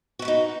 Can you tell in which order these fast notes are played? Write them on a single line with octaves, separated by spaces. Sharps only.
F#4 E4 B4 D#4